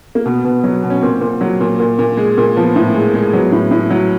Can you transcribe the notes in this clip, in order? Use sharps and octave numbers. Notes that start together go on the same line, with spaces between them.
A#3
B2 B3
B2
F#3
B2
C#4
A#2 C4
A#2
F#3
A#2
A#2
A#2
G#3
A#2
F3 B3
A2
G#3
G#3
F#3 B3
A2
A2
F#3